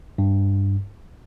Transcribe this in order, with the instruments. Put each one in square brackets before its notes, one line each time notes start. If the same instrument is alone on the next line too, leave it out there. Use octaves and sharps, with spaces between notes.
[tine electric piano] G2